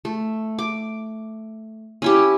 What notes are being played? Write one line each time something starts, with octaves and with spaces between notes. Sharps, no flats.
A3
D6
C#4 E4 G4